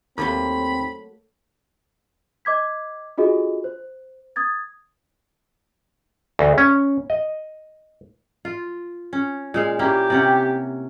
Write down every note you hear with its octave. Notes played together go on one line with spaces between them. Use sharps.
D#2 F#3 A3 A#3 C4 B5
D#5 D6 G#6 B6
D4 F4 F#4 G#4 A4 D#5
C5
D#6 G#6 A6
D2
C#4
D#5
F4
C#4
A#2 G#3 F5
A#3 C#4 E4 G4
C3 C#4 F#5